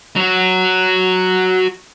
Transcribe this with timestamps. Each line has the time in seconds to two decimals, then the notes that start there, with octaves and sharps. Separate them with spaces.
0.16 F#3 F#4